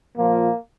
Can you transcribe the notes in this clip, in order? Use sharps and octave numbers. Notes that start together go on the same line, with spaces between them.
A#2 F3 A#3